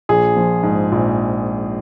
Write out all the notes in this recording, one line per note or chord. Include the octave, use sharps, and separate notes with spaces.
A#1 G#4
F3
G#2
A#1